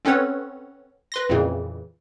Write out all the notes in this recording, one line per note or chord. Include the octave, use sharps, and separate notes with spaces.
C4 C#4 A4 B4 C#5 F#5
B4 C6 A#6
F2 A#2 C#3 E3